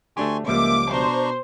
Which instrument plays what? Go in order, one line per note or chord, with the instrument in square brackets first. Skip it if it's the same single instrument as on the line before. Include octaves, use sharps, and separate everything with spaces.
[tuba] D2 [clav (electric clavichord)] A3 D4 G4 [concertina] G#5 C6 C#6
[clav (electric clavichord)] C#2 F3 G3 [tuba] A#3 [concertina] E5 [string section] D6
[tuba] B2 [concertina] D4 A#5 C#6 [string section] C5